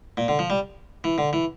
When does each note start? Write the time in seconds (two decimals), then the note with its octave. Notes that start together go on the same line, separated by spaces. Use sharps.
0.17 A#2
0.28 D3
0.39 F3
0.50 G3
1.04 E3
1.18 D3
1.33 E3